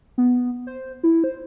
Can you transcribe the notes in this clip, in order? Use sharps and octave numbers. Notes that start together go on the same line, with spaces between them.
B3
C5
E4
C5